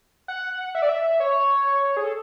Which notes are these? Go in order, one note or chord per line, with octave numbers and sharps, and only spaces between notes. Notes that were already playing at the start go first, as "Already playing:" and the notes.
F#5
E5
D5
E5
C#5
G#4
A4